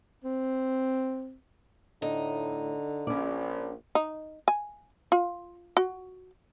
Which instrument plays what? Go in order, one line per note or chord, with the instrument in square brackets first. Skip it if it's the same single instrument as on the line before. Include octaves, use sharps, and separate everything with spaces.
[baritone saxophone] C4
[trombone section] A2 [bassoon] D3 [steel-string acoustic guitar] D#4
[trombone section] A#1 [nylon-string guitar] C#4 D5
[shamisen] D#4
G#5
F4
F#4